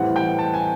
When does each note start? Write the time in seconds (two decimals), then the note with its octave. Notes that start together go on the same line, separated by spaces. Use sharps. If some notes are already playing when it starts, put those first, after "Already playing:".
Already playing: A2 E3 G3 C4 F#5
0.16 G5
0.39 A5
0.54 G#5